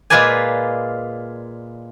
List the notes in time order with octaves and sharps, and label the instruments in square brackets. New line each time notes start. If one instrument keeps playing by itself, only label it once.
[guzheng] A#2 G#3 F4 B4 D5 G#5